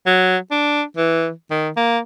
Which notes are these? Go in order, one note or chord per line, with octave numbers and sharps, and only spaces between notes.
F#3
D4
E3
D#3
A#3